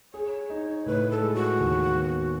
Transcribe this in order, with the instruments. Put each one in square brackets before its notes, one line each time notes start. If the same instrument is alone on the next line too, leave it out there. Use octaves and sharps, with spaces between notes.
[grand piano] G#4 [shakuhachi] C#5
[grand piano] D#4
[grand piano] A2 [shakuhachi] B4
[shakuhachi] A4
[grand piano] G#3
[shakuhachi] F#4
[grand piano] D#2
B3